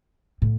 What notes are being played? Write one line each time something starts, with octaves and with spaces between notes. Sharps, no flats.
A2